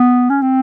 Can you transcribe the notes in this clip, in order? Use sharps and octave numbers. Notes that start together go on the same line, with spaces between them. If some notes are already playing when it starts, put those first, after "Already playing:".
Already playing: B3
C#4
C4